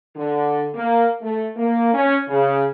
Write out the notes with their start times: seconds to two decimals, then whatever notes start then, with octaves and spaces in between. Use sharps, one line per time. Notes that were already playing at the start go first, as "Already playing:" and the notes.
0.15 D3
0.74 A#3
1.21 A3
1.55 A#3
1.93 C#4
2.27 C#3